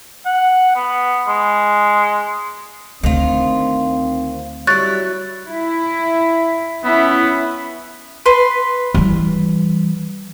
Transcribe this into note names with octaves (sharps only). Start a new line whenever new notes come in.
F#5
B3
G#3
D2 D3 D#3 C4 F4
F#3 G3 E4 C#6 F#6 A6
E4
B3 C#4 E4 E5
B4 C6
E3 G3